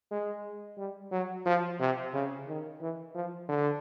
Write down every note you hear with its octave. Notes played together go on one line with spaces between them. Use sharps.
G#3
G3
F#3
F3
C3
C#3
D#3
E3
F3
D3